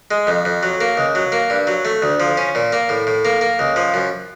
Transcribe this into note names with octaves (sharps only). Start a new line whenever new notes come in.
G#3
F2
F2
F#3
A#3
C#2
F#3
A#3
G2
F#3
A3
D2
F3
C#4
A#2
A#3
A2
A2
A#3
A#3
C#2
F3
F#2